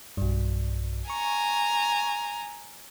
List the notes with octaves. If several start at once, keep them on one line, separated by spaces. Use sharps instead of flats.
B1 G2
G#5 A#5 C#6